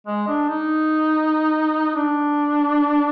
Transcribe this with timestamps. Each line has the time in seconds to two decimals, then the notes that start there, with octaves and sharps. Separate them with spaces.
0.07 G#3
0.28 D4
0.49 D#4
1.95 D4